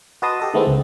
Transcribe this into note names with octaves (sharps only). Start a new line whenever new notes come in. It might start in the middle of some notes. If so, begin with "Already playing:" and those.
F#4 B4 D#5 A5 C6 D#6
G4 A4 D#5
D#3 G#3 A3 B3 C4 E4
C#2